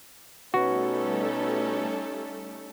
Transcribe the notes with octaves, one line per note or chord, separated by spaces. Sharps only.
B2 G3 A3 C#4 D#4 F#4 A4 B4